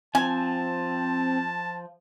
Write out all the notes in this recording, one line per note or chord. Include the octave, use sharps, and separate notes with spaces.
F3 C4 G#5 A5